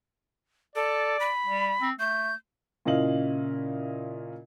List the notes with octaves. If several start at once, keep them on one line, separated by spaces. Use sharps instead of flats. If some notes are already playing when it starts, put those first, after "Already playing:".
A4 D5
B5
G3
C4
A3 G6
A#2 C#3 E4 D#5 F5 F#7